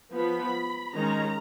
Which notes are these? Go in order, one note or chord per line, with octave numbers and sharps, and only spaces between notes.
F3 B3 B5
D#3 G#3 C#4 A#5